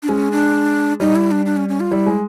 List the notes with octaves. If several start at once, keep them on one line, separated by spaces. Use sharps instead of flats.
D4
G#3 C#4
D4
G3 D#4
E4
D4
D4
C#4
C#4
F4
G3 E4
G#3